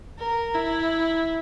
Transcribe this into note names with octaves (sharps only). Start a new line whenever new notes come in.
A#4
E4